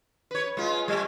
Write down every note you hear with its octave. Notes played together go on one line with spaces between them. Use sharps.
B4 C#5
G#3 F4
G3 A3